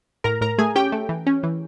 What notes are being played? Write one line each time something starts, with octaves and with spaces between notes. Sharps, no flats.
A2 A#4 A#5
A2 A#4 A#5
A3 G#4 G#5
C#4 G4 G5
A3
E3
C#4
E3